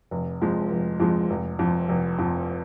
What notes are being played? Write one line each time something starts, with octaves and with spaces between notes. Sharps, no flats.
F1
F2 F3 G#3
F1
F2 F3 G#3
F1
F2 F3
F1
F2 F3